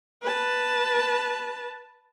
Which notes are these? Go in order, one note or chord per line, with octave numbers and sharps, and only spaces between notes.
B4 A5